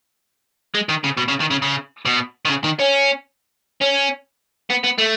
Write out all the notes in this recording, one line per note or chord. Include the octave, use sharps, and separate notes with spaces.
G#3
D#3
C#3
B2
C#3
D#3
C#3
C#3
B2
D#3
C#3
D#3
C#4
C#4
B3
B3
A3